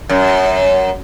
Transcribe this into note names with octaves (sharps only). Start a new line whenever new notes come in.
F#2